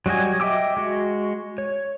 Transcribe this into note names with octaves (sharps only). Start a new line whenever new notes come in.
F#3 G3 F#4 D#5 G#5
D#5 E5 G5 D6 E6
G#3 F#4
C#5